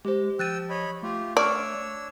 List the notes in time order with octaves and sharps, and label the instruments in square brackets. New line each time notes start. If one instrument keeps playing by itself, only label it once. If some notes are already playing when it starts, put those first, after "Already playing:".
[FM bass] G#3 [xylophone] G4 C5
[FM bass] F3 [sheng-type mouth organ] G5 E6 [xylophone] F#6 A6 D#7
[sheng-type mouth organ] C#5 D#5 B5
[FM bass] A3 [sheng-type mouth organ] F4 G4
[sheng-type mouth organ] D4 C#5 E6 [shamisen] D5 [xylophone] C#6 F6